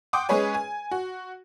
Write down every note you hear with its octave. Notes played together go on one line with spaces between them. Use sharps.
F#5 G5 C6 D6 D#6
G#3 C#4 G#4 B4 C#5 G#5
G#5
F#4